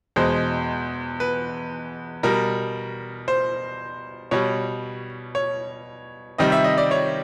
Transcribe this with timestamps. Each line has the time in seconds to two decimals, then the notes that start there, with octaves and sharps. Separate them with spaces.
0.16 E2 B2 G#3 C5
1.20 B4
2.23 B2 G3 A#4
3.28 C5
4.31 B2 G3 C#5
5.35 C#5
6.38 C3 D#3 G3 D#5
6.52 E5
6.64 D#5
6.78 D5
6.91 C#5